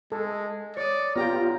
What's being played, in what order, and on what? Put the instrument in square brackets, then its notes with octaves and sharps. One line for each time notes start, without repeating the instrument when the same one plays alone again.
[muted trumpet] G#3 [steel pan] A4
[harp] C#5 D#6 [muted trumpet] D5
[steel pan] B3 G4 G5 [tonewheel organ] F4 [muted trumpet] A#5